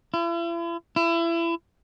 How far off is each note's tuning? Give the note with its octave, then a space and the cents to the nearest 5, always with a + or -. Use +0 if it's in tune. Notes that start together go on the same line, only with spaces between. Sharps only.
E4 +45
E4 +30